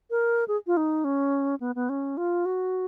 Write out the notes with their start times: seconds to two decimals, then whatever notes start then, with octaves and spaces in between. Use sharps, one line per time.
0.10 A#4
0.48 G#4
0.67 F4
0.77 D#4
1.04 C#4
1.60 B3
1.75 B3
1.89 C#4
2.17 F4
2.45 F#4